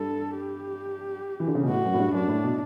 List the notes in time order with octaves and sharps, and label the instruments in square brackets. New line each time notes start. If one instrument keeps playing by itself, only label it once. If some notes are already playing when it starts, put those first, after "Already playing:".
Already playing: [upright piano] G2 [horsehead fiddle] A4
[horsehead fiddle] G4
[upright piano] E3
D3
C#3
B2
[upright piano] A2 [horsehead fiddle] F#4
[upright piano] F#2
A2
G2
[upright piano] F#2 [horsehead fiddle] D4
[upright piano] A2
B2